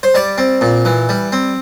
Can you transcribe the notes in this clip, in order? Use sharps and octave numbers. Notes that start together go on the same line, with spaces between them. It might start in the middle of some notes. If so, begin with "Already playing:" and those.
C5
G3 D5
C4
A#2
E3
G3
C4